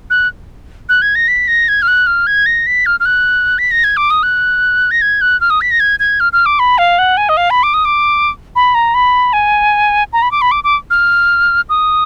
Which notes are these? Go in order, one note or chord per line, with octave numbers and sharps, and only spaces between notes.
F#6
F#6
G#6
A#6
B6
A#6
G#6
F6
F#6
F6
G#6
A#6
B6
F6
F6
F#6
B6
A#6
G#6
D6
D#6
F#6
A#6
G#6
F#6
F6
D#6
B6
A#6
G#6
G#6
F6
F6
D6
B5
F5
F#5
G#5
D#5
F5
B5
D6
D#6
D6
B5
A#5
B5
G#5
A#5
B5
D6
B5
D6
D6
F6
D#6